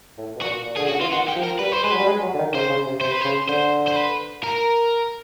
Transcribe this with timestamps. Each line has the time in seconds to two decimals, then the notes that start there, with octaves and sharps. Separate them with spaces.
0.18 A2
0.36 B2
0.41 A#2 F#4
0.65 A#2
0.77 D3 G#4
0.89 C#3 F#4
1.00 E3 F4
1.12 D#3 F#4
1.28 G4
1.36 F3
1.44 A#4
1.59 G3 B4
1.72 C5
1.83 G#3 B4
1.92 F#3
1.99 G3
2.07 G#3
2.22 F#3
2.34 D3
2.39 D#3
2.54 C#3 C5
2.70 C#3
2.86 C3
3.01 C3 C5
3.11 B4
3.21 C#3 C5
3.48 D3 C5
3.88 C5
3.96 B4
4.44 A#4